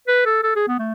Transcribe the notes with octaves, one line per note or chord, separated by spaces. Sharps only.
B4
A4
A4
G#4
B3
A3